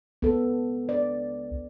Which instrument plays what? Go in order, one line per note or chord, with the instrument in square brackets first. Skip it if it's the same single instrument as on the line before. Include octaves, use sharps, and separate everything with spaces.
[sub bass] C#2 [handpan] B3 A4
[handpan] D5